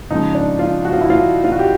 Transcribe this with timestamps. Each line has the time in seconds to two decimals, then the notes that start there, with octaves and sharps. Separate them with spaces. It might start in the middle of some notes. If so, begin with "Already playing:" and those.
0.11 C#3 F3 G#3 D#4
0.35 D4
0.59 F4
0.85 F#4
0.93 F4
1.01 E4
1.10 F4
1.44 F4
1.52 F#4
1.59 G4